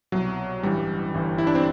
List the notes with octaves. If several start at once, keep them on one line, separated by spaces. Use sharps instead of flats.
C2 B2 F#3
A1 G2 E3 G3
G1 G2 E3
E4
D4
C4